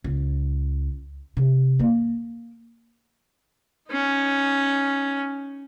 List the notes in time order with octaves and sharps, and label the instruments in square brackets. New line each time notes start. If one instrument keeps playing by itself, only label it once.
[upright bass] C#2
C3
A#3
[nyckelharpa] C#4 D#4